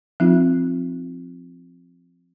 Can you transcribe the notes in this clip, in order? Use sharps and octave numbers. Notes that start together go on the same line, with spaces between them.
F3 C4 D#4 F4